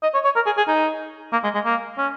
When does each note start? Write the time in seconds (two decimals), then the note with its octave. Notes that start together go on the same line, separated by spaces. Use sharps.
0.03 D#5
0.14 C#5
0.24 C#5
0.36 A#4
0.46 G#4
0.57 G#4
0.68 D#4
1.33 A#3
1.44 G#3
1.54 G#3
1.65 A#3
1.98 C#4